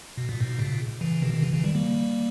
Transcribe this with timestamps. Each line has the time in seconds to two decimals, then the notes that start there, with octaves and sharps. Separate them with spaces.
0.17 B2
0.29 A#2
0.40 G#2 B2
0.59 A#2 C#3
1.01 C#3 E3
1.22 B2 D#3
1.34 D#3
1.42 C#3 E3
1.53 C#3 E3
1.64 D#3 G3
1.75 G3 A#3